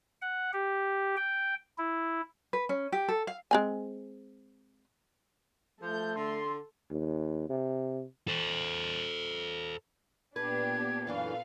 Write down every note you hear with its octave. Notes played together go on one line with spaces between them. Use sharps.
F#5
G4
G5
E4
B4
C#4
G4
A4
F5
G#3 C4 G#5
F3 A3 A4 G6
D3 C6
D#2
C3
A4 C5
A#2 B3 D4 G4 B4 G#6
F#2 E3 D4 F4 A4 B4 F5